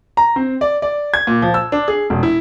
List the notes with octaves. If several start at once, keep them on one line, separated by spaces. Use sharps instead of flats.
A#5
C4
D5
D5
G#6
A#2
F3
E6
D4
G#4
E1
E4